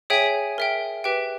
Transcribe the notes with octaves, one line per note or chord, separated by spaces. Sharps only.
G#4 C#5 E5 G5 G#5
A#4 E5 G5
G4 B4 E5 G5